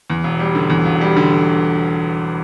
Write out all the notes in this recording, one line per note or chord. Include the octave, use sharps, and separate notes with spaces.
E2
E1
G3
D3
E2
E1
G3
D3